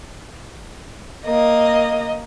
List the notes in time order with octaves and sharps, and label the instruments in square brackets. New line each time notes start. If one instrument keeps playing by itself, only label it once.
[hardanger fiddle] A#3 [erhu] D#5